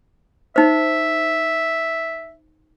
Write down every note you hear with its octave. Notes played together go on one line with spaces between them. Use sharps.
D#4 C5 E5